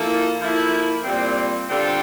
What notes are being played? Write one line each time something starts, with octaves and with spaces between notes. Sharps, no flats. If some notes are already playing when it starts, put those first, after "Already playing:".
Already playing: F3 A#3 E4 A4
F3 A#3 E4 A4
A#2 G3 C4
D3 G3 C4 F4 A4